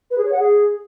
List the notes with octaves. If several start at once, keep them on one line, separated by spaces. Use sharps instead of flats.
B4
G#4
C#5
F#5
G#4